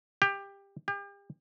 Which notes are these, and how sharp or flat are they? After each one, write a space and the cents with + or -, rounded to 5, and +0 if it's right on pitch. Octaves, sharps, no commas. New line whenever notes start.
G4 +20
G4 +40